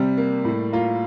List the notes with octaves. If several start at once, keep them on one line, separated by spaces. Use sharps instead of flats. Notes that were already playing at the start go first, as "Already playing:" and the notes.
Already playing: C3 G3
A#3
A2
A#3 F4